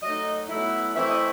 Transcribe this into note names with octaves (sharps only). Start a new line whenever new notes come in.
F#3 A3 D#4 D#5
B2 F#3 A3 E4
E3 A3 C4 E4 E5
D#5